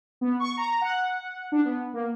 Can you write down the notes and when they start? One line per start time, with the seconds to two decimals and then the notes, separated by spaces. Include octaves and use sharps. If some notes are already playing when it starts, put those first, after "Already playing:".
0.21 B3
0.40 C#6
0.57 A#5
0.81 F#5
1.52 D4
1.65 B3
1.94 A#3